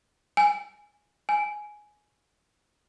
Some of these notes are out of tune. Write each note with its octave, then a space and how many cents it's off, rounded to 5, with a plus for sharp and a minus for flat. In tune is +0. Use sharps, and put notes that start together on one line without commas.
G#5 -5
G#5 +10